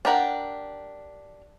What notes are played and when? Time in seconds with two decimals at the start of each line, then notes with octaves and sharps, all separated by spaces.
0.05 D4 G4 A#4 F#5